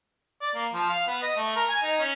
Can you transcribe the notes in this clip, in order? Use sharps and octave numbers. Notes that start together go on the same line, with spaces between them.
D5
A#3
F3
F5
B3
D#5
A3
A#4
G#5
D#4
C#4